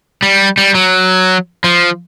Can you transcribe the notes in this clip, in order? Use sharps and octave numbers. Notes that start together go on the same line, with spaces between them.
G3
G3
F#3
F3